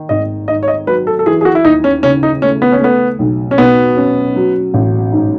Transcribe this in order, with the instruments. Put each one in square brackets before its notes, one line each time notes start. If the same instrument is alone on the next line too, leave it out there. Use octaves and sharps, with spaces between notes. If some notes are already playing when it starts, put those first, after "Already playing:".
Already playing: [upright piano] D#3
[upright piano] G#1 [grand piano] D#5
[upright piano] G#2 [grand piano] D#5
[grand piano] C#5
D#5
[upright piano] F#3 [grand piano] B4
[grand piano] A4
A4
[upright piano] E3 [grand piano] G#4
[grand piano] G#4
F#4
E4
[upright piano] D#2 [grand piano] D#4
[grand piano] C#4
[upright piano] C#3 [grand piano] C#4
[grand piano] D#4
[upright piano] A3 [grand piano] C#4
[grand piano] B3
C#4
[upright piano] A3 [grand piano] B3
[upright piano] B1
[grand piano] C#4
[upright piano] B2 [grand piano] B3
[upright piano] C#4
F#3
A1
G#2